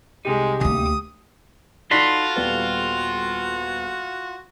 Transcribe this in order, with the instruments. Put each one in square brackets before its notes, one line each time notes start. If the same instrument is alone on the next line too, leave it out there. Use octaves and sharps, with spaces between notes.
[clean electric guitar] C2 C3 D#4 [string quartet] G#3 [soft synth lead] G4
[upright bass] D2 A#3 [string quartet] D#6
[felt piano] D#4 D5 [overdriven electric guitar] F4 [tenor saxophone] F#4 [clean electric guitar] A4 B5 C6
[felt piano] D#1 G3 B3